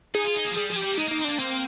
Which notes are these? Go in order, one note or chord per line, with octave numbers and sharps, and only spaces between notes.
D#4 G#4
F4
D#4
A#3
F3
G3 G#4
F3 G#4
G4
G3
A#3
G#3 D#4
A#3 D#4
C4
A#3 D4
A#3 C4